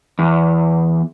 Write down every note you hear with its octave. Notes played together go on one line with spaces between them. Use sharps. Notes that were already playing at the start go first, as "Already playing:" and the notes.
E2